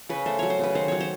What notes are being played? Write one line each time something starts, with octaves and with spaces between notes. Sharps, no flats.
C#3 B4
A3 C5
F#3 C#5
C5
C#3 B4
D#3 C5
F#3 C#5
C5